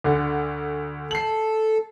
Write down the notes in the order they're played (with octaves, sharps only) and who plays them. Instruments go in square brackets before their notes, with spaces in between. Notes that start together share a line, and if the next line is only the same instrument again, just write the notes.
[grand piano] D2 D3
[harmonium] A4 [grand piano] C7 F#7